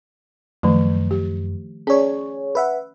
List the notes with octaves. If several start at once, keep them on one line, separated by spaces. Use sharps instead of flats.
F#2 D#3 F3 A3
G4
C#4 G#4 C#5 D5
B4 E5 F#5